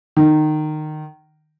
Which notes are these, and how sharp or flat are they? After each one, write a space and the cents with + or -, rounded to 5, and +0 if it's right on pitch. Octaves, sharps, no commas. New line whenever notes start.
D#3 -20